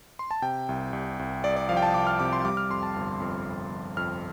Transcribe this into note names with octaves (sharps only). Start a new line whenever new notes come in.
C6
A5
C3 G5
C2
C2
C2
C2 D5
D5
F3 F5
G5
A5
C2 D6
F6
C3 D6
C6
G3 D6
F6
F2 C6
A5
G1
F2
F2
F2
F2 F6